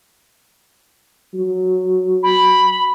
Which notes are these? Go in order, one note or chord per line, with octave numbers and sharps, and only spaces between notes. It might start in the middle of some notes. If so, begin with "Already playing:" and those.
F#3
B5